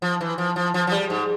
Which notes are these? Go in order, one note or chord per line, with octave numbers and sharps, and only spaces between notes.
F3
E3
F3
F3
F3
F3
G3
G#2